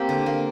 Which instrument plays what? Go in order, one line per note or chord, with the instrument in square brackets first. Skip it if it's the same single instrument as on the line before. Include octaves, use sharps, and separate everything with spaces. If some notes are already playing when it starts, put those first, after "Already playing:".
Already playing: [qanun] A#3 C4 G4
D3
A#3